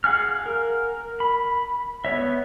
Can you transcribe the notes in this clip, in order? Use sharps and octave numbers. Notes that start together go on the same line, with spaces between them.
G#4 F5 F#5 G#5 F6
A#4
B5
B3 C#5 E5